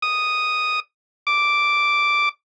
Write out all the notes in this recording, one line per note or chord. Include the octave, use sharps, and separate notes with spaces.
D#6
D6